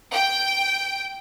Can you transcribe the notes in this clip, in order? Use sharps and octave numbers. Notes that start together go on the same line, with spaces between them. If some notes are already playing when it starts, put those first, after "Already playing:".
G5